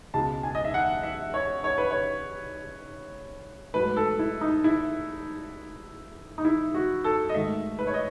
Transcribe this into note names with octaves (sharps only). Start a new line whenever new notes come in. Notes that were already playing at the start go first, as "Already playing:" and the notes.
C#2 B2 G#3 A5
G#5
D#5
E5
F#5
E5
C#5
C#5
B4
C#5
G#2 F#3 A3 B4
A4
E4
D#4
E4
D#4
E4
F#4
A4
D#5
G#2 D#3 A3 E5
B4
C#5
D#5